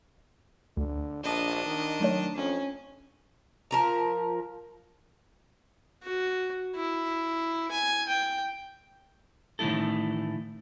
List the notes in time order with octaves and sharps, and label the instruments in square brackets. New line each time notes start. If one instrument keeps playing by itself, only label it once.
[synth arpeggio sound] D2 [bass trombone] D3
[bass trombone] A#1 [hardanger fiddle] D4 D#5
[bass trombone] D#3
[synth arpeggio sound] F#3 A3 C#5
[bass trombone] F2 [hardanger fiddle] C#4
[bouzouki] F3 A#4 A#5
[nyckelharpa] F#4
E4
G#5
G5
[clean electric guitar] A2 D#3 E3 A3 E4 A4